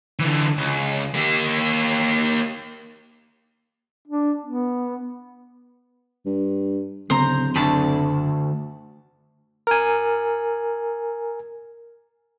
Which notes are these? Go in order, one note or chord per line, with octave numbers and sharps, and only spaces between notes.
D3 E3
C#2
A#3 G4
D4
B3
G2
D1 C#3 B3 C#4 C5 A#5
F#1 D2 D4 A5 B5
A#4 G#5